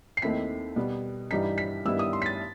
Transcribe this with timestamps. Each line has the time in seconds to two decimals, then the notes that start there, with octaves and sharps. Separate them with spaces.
0.17 C7
0.22 D#2 D#3 A3 C4 E4 B6
0.76 B2 G3 B3
1.31 G2 E3 G3 D#4 B6
1.58 B6
1.85 G2 D#3 G3 B3 E4 E6
1.99 D#6
2.13 C6
2.22 B6
2.26 A6